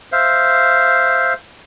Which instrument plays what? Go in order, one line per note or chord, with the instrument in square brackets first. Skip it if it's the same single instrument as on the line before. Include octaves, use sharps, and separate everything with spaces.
[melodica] C5 E5 F5